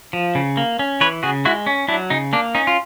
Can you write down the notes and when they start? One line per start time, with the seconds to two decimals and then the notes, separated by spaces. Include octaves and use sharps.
0.13 F3
0.35 C#3
0.57 A#3
0.79 C#4
1.01 E3 B4 C#5
1.23 C#3 F#4 G#4
1.45 G#3 E4 F#4
1.66 C#4
1.88 F#3 D4 E4
2.10 C#3 D#4
2.33 A#3 D4
2.55 C#4 D#4
2.67 F4